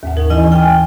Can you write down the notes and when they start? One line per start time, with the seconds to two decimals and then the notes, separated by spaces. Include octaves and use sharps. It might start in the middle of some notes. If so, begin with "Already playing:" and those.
0.03 D#2 G#2 F#5
0.17 C#4 D#4 A#4
0.30 E3 E4 D#5 G#5
0.52 G5 G#5 F6